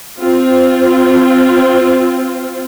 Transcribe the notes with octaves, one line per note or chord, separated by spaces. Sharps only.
C4 F4